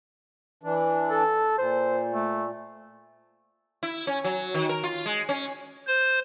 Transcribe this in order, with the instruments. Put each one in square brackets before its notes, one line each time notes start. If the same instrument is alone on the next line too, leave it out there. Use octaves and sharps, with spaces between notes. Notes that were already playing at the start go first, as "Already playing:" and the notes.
[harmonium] E3 D4
[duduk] A4
[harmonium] A#2 [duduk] C5
[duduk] A3
[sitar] E4
C#4
F#3
D#3
A#4
F4
G#3
C#4
[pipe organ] C5